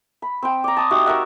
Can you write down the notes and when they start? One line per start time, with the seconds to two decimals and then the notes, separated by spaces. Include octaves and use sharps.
0.22 B5
0.42 C4 G5
0.64 D5 A#5
0.77 A5 D#6
0.91 D#4 F#4 G4 E5
1.06 A#4 C#5 E5 F#5